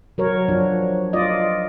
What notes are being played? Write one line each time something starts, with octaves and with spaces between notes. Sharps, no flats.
F#3 A#4 C#5
F3 D4
F4 D5 D#5